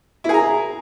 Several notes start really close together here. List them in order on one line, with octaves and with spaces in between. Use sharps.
E4 G#4 A#5